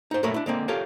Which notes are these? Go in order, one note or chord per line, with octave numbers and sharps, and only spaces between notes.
D#4 C5
F#2 A#2 A3 A#4 C#5 B5
D4 E4
D3 G#3 A#3 C4
F4 G4 A4 A#4 C#5 F5